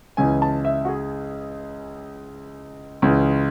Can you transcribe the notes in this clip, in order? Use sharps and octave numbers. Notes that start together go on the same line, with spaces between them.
C#2 C#3 E3 G#5
A5
E5
F#4
G#4
C#2 C#3 E3